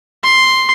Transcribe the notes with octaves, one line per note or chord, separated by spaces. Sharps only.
C6